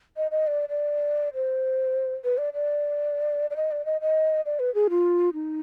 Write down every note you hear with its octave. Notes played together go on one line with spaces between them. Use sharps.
D#5
D#5
D5
D5
C5
B4
D5
D5
D5
D#5
D5
D#5
D#5
D5
B4
G#4
F4
D#4